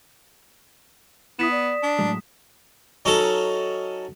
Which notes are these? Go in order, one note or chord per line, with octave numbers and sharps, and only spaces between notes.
B3 E4 D#6 B6 E7
D5
D4
A2 F#3 G#3
F#3 C#4 D#4 A4 A#5